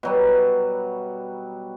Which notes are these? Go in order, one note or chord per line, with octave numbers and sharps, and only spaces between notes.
B2 F#3 G3